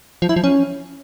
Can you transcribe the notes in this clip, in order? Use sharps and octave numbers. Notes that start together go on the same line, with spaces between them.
F3
E4
F3
C#4